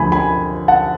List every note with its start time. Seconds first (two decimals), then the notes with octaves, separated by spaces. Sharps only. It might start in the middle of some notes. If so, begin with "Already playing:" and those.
Already playing: D2 D3 F3 G#5 B5
0.12 G#5 B5
0.68 F#5 A5